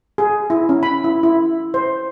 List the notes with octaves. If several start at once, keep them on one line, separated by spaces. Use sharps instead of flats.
G#4
E4
C#4
B5
E4
E4
C5